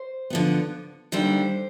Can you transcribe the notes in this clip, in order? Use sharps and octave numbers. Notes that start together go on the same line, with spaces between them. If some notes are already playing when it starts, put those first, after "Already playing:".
Already playing: C5
D3 F3 B3
D#2 D3 G3 C5